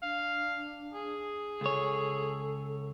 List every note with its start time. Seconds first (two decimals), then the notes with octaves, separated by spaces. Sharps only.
0.02 D4 F5
0.94 G#4
1.61 C#2 A4 C#5